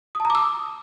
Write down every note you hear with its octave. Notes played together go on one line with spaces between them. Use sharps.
D#6
A5
A#5
D6
E6